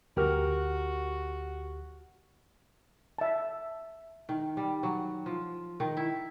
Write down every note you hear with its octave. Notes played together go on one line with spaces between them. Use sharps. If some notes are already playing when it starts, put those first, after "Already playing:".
D2 F#4 G4 A#4 F6
E5 A5
D#3
G3
F#3
F3
D#3
E4